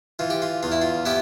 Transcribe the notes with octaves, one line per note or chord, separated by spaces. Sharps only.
E3 F4
G4
F4
E2 F4
E4
F4
B3 E4 G4